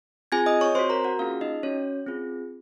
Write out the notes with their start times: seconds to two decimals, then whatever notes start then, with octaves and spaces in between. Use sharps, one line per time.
0.32 C4 F4 G#4 G#5 G#6
0.46 D#5 D#6
0.61 C#5 C#6
0.75 C4 C5 C6
0.79 F#4
0.90 A#4 A#5
1.04 F#4 F#5
1.19 A#3 C#4 F4 G#4 F5
1.41 D#4 D#5
1.63 C#4 F#4 C#5
2.07 C4 F4 G#4